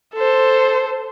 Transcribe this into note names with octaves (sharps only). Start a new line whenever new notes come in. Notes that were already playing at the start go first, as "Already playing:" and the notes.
A4 C5